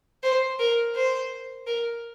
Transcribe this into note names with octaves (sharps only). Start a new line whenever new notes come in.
C5
A#4
C5
A#4